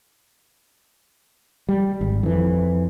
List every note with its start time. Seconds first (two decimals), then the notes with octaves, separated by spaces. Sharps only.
1.69 G3
2.01 G#1
2.23 F2 E3